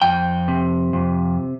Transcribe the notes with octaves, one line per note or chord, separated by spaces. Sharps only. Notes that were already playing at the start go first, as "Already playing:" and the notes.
F2 G5
C3
F2